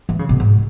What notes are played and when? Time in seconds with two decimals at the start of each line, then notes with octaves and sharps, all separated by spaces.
0.09 E3
0.19 C#3
0.29 B2
0.40 G#2